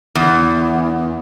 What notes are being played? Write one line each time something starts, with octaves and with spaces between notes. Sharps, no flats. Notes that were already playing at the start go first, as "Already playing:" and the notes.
E2